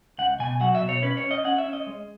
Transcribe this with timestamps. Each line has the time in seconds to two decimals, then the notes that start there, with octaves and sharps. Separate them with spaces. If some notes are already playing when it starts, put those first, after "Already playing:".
0.18 C#2 F#5
0.40 B2 G#5
0.60 F#3 F#5
0.75 E5
0.82 B2
0.89 C#5
1.02 C#4 B4
1.17 C#5
1.24 C#4
1.31 D#5
1.44 C#4 F#5
1.58 E5
1.66 C#4
1.73 D#5
1.87 G#3